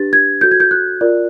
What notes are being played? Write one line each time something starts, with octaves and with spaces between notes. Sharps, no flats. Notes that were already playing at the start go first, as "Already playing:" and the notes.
Already playing: D4 G4 B4 A6
G#6
F#4 A4 C#5 G6
G#6
G6
F#6
F4 A#4 D5